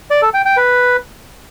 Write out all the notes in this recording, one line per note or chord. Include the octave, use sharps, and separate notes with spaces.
D5
A4
G5
G5
B4